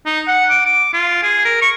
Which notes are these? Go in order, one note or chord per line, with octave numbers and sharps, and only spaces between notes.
D#4
F#5
D6
D6
F4
G#4
A#4
C#6